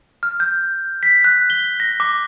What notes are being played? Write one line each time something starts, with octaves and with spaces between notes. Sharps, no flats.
F6
G6
B6
F#6
G7
A#6
D6